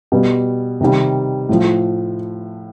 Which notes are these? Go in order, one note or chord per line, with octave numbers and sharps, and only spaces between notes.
B2 G3
C3 D#3 G3
A2 F3